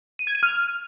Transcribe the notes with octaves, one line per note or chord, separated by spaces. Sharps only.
D#7
G#6
D#7
F6